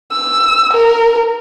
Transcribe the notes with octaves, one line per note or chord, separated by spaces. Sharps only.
E6
A#4